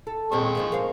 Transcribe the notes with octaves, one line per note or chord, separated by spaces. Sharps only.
A4
D#2 A#2 G#3 C4 C#6
D#3 F3 A#3
A#4 C5 F5